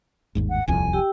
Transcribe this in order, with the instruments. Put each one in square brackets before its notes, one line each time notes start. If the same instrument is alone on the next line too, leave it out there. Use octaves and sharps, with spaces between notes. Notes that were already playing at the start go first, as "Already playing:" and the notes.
[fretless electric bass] G1 D#2 G#2
[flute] F#5
[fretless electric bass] D#1 C2 F2 [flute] G#5
[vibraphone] G4 G5 E6